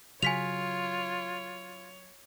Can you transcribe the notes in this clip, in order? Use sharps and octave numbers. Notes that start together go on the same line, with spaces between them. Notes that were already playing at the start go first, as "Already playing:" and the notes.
C#3 F#3 F4 C#5 G#5 B6 F7